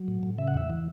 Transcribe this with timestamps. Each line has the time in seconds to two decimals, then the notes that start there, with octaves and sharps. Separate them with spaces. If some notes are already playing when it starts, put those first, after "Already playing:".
Already playing: F#3
0.08 A2
0.23 A2
0.38 C#3 E5
0.48 F#5
0.54 E2 E5
0.70 E3